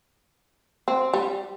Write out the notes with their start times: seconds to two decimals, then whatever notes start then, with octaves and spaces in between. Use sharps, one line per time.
0.88 C4
1.14 G3